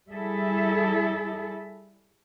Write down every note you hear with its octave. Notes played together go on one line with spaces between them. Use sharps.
G3 E4 G#4 A4 E5